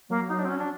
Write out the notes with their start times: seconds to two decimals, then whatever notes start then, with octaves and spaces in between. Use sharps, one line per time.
0.10 F#3 A#3
0.29 D#4
0.39 D4
0.45 C4
0.49 C#4
0.59 D4